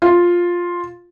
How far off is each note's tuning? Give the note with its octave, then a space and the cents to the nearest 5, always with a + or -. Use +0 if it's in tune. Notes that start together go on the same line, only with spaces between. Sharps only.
F4 +5